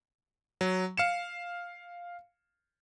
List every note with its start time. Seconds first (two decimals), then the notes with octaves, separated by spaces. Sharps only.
0.61 F#3
0.97 F5 C#7 E7